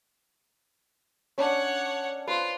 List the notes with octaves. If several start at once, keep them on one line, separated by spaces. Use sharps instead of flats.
C#4 D4 C#5 F#5
F4 B4 C5